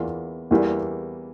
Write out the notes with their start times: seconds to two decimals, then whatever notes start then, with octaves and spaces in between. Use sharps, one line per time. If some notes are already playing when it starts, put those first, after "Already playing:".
Already playing: E2 E3 A#3 F4
0.51 E2 E3 G3 A#3